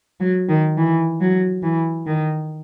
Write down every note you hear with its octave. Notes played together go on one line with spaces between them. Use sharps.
F#3
D#3
E3
F#3
E3
D#3